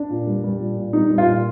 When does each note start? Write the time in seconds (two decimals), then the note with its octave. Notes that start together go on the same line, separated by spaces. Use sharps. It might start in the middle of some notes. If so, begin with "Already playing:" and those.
Already playing: D4
0.10 A#2
0.27 G3
0.44 G3
0.60 A#2
0.77 A#2
0.93 G3 D#4
1.10 G3
1.18 F4
1.26 A#2